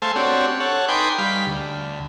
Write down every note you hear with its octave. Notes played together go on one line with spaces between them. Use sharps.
A3 A4 C5 F5 G#5
C4 D4 F#4 G4 C#5
A4 C#5 F#5
D#4 B4 G5 G#5 C6 D6
G3 F5 B5
D2